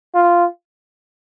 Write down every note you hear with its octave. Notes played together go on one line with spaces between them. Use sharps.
F4